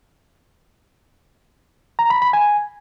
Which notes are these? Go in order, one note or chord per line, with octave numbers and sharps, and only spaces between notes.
A#5
B5
B5
G#5